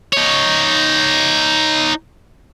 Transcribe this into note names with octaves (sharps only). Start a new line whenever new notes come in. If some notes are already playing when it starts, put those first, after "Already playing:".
D#4 C#5